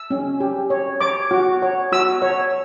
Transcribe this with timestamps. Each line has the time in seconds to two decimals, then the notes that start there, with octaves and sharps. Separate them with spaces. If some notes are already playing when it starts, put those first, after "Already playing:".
Already playing: E6
0.11 C#4
0.40 G4
0.70 C#5
1.01 C#5 D6
1.31 F#4
1.62 C#5
1.92 F#4 E6
2.22 C#5